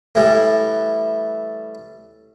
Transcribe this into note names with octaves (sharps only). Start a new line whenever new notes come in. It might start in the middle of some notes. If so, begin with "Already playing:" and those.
A2 E3 G3